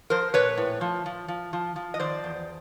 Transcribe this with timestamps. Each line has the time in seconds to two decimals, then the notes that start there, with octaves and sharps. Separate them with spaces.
0.10 F3 A#4 C5
0.34 A#2 B4 C#5
0.57 A2
0.81 F3
1.06 F3
1.28 F3
1.53 F3
1.76 F3
1.94 D#5
1.99 D#3 C5 D5
2.24 E2